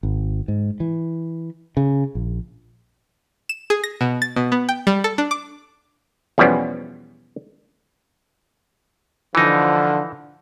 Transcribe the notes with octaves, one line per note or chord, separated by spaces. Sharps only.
G#1
G#2
E3
C#3
A#1
E7
G#4
A#6
B2
A6
B2
B3
G5
G3
A4
D4
D6
E2 B2 F3 G3 B3 C#4
D3 E3 F3 D#4